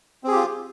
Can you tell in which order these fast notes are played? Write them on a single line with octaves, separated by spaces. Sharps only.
C4 G#4 G4 F4